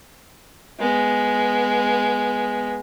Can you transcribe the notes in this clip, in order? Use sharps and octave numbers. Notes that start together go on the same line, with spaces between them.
G#3 B3